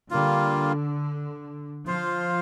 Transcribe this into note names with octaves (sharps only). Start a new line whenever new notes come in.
D3 G3 A#3 F4
F3 F4 C5 F5